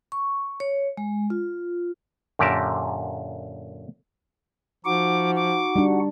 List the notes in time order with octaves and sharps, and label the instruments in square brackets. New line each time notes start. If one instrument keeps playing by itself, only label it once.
[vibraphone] C#6
C#5
G#3
F4
[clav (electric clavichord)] F#2 A#2 D3 G4 A#4 A5
[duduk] F3 [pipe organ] D#4 F#4 F#5 [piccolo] D6
[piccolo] D6
[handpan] G3 D4